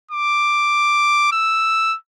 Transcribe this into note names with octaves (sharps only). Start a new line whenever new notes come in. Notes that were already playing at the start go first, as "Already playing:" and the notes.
D6
E6